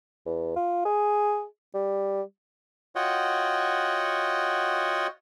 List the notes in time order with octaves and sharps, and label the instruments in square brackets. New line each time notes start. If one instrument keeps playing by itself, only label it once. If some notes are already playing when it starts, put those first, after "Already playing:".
[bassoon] E2
F4
G#4
G3
[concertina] F4 F#4 C#5 D#5 F#5 G5